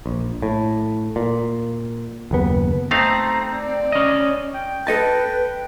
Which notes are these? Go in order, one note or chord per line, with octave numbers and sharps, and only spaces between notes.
A#1
A2
A#2
F#1 D#2 B3
A3 C4 D#4 F5 A#5
D5
C#4 D#5
G5
A4 B4 D#5 A5